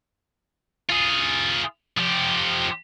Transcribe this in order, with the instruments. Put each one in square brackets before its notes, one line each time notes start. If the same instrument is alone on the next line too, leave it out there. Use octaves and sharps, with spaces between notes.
[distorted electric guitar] F4 G#4
F3 G4